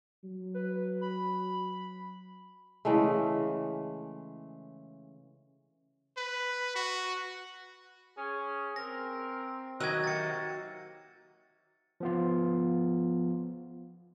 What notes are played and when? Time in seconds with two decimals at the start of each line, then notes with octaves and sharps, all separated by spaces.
0.24 F#3
0.54 B4
1.01 B5
2.85 C#3 E3 G#3 A3
6.17 B4
6.76 F#4
8.17 C#4 G#4
8.76 C4 A#4 A#6
9.80 D#3 F#3 F#4 B4 D#5 E6 G#6
10.04 C3 A#3 A6 C#7
12.00 F3 B3 F4